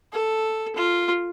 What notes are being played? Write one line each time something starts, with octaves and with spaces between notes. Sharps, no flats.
A4
F4